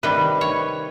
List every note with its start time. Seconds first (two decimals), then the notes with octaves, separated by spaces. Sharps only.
0.03 C3 D#3 G3 B4
0.41 C#5